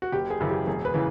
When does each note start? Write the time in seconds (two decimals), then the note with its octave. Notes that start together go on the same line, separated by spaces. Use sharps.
0.02 F#4
0.12 F#1 G4
0.30 G#4
0.40 F#2 C#3 E3
0.49 G4
0.67 E1 G#4
0.85 B4
0.94 C#3 E3